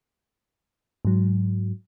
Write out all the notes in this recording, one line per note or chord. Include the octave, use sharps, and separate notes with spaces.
G#2 F#3